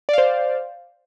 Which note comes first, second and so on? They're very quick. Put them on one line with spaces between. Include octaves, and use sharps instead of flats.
D5 F5 C5